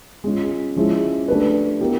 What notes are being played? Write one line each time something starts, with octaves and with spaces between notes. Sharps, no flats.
G#3 C#4 F4
F3 G#3 C#4 E4 G#4
A3 D4 G4 B4
B3 E4 G4 A#4